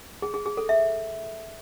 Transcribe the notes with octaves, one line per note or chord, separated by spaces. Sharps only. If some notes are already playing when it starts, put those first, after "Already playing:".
G#4
G#4
G#4
A4
E5